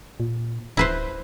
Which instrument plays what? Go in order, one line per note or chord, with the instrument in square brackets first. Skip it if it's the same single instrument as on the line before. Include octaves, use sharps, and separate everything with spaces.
[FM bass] A#2
[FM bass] D1 [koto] E4 B4 C5